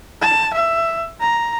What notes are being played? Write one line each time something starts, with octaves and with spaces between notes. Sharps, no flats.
A5
E5
A#5